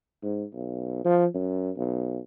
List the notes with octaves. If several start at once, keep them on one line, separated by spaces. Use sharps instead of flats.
G#2
B1
F3
F#2
B1